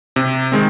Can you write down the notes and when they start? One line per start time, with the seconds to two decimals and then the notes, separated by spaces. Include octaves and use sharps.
0.16 C3
0.52 D#3 G#3 C4